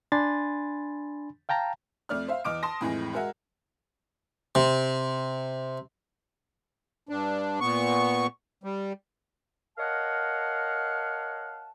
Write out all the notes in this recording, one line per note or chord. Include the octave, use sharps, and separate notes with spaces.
D4 G#5 B5 C6 A6
F5 G5 A5 A#5
F2 A3 D5 F6
C5 E5 F5
E2 D#5 D6 F6 D7
A5 C6 D#6 A#6
F2 A2 E3 G#3
G#3 F#4 A#4 E5 F#5
C3
G2 D4
A#2 B3 C#6
G3
A#4 C#5 D#5 F5 F#5 A5